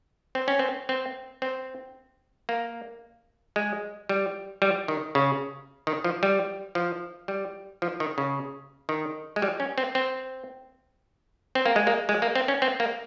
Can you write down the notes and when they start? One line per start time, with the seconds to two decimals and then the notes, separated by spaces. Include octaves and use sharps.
0.35 C4
0.48 C#4
0.59 C4
0.89 C4
1.42 C4
2.49 A#3
3.56 G#3
4.09 G3
4.62 G3
4.88 D#3
5.15 C#3
5.87 D#3
6.04 F3
6.23 G3
6.75 F3
7.28 G3
7.82 F3
8.00 D#3
8.18 C#3
8.89 D#3
9.36 G#3
9.42 G3
9.60 C#4
9.78 C4
9.95 C4
11.55 C4
11.66 A#3
11.76 G#3
11.87 A#3
12.09 G#3
12.22 A#3
12.36 C4
12.48 C#4
12.62 C4
12.80 A#3